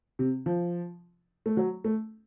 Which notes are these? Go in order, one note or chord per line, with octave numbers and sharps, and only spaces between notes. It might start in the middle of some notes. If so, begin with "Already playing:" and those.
C3
F3
A3
F#3
A3